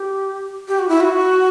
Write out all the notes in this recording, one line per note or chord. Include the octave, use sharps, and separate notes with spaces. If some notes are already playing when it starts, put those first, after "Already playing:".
Already playing: G4
G4
F#4
E4
F#4